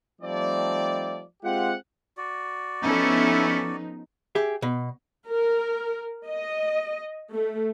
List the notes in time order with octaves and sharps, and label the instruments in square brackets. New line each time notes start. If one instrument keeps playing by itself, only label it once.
[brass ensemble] F3 G3 A3 C4 D#4 D5
G#3 C4 F4 G4 F#5
[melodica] F#4 D5
[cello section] F3 B3 D#4 [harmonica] A3 E4 [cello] C#4 A4
[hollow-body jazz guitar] G4 G#4 E5
B2
[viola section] A#4
D#5
A3